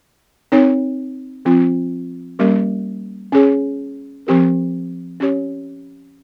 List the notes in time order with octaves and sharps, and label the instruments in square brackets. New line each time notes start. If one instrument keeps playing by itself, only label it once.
[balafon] C4 D#4 A#4 C#5
F3 C4 F4
G3 A#3 C#4 G4 A#4
C#4 G#4 C#5
F3 C4 G4 A#4
C#4 G4 C#5